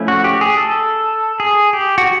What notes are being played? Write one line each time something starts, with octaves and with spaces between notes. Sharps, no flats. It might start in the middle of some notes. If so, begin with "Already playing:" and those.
Already playing: F3 A3 C#4 E4
F#4
G4
G#4
A4
G#4
G4
F#4